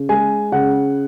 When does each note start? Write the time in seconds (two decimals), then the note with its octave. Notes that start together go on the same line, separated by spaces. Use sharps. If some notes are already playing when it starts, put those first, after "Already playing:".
Already playing: C#3
0.09 G#3 G#5
0.52 C#3 F#5